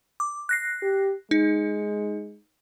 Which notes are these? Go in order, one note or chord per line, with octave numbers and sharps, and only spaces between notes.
D6
F#6 A#6 C7
G4
G#3 D#4